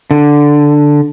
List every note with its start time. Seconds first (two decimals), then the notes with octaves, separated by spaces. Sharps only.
0.11 D3